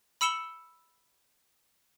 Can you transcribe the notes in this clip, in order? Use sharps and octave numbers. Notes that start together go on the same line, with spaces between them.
B5 E6 C#7 E7 G7